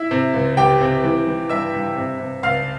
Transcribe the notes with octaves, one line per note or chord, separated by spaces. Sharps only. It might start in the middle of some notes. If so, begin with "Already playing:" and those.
Already playing: E4 E5
C3
C#2
C#2 G4 G5
C3
E3
E3
G2 E5 E6
G2
C3
C3
C#2 F5 F6